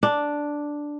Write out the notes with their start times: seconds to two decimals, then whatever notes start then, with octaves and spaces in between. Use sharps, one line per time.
0.03 D4